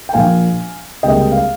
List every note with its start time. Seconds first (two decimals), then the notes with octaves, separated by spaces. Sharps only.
0.09 G5
0.13 A#1 A#2 F3 A#3 F5 G#5
1.03 C#2 C3 G3 A#3 D#5 G5
1.32 F5